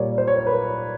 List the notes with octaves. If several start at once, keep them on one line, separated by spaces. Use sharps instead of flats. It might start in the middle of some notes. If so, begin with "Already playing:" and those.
Already playing: A#2 G3 A#3 C#5 D5
C5
C#5
C5
B4
A#4